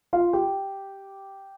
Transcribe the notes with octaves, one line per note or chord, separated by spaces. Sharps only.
F4 F5
G4 G5